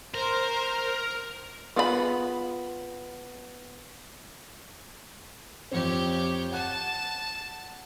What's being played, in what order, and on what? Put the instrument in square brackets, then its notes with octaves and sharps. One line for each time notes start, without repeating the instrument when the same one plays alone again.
[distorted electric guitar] A#4 [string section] C5
[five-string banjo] B3 F4 G#4 G5 B5
[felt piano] F2 C4 [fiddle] G4 C#5
[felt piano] F#5 F#6 [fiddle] A5